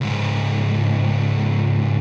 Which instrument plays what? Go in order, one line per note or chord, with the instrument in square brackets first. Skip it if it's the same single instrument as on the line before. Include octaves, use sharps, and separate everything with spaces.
[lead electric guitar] C#2 G#2